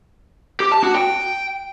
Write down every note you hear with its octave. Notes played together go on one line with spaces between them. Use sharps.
G4
A5
F#4
G5